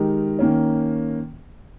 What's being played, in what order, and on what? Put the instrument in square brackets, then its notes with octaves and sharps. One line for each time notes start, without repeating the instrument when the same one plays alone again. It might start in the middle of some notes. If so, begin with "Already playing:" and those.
Already playing: [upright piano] D#3 G#3 D#4 G4 A#4
D#3 A#3 C#4